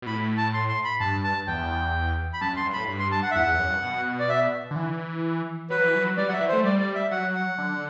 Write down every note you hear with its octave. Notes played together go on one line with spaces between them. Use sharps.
B2
A2 B5
A5
C6
C6
B5
G2 A5
A5
E2 G5
B5
F#2 A5
F#2
C6
G2
A2 B5
G2
C6
A5
F#5
E5
E2 F#5
E2
F#2
G2
B2
D5
E5
D3
E3
F#3 B4
E3
F#3
G3 D5
F#3 F#5
E5
E3
A3 C5
G3 D5
D5
E5
F#3 F#5
F#5
D3